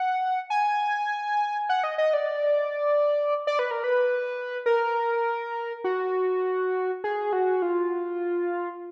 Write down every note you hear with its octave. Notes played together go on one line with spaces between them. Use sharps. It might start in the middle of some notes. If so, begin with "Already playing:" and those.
Already playing: F#5
G#5
F#5
D#5
D#5
D5
D5
B4
A#4
B4
A#4
F#4
G#4
F#4
F4